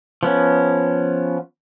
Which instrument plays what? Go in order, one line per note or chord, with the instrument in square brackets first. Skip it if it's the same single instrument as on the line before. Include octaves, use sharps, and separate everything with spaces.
[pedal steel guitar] F3 B3 C#4